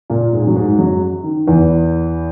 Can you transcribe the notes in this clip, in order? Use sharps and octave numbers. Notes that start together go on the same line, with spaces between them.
A#2 A#3
G#2 G#3
F#3
G#2 G#3
F#2 F#3
D#3
E2 E3